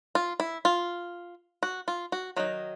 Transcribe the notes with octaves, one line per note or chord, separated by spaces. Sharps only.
F4
E4
F4
F#4
F4
F#4
D#3 F#3 D#4